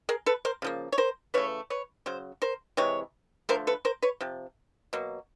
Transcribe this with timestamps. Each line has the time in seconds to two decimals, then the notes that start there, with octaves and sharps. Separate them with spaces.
0.09 G#4 A#4
0.26 A4 B4
0.45 A#4 C5
0.62 C#3 F3 A#3
0.92 C#5
0.98 A#4 C5
1.34 C#3 E3 A3 B4 C#5
1.70 B4 C#5
2.06 C#3 F#3 C5
2.42 A#4 C5
2.77 C3 E3 G#3 C#5
3.49 D3 F3 A3 A#4 C5
3.67 A4 B4
3.85 A#4 C5
4.02 B4 C#5
4.21 C3 F3
4.93 B2 F#3 A#3